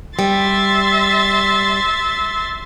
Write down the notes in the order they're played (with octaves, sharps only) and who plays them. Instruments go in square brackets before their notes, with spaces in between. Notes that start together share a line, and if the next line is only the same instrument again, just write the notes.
[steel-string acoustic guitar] G3 [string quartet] E5 C6 A6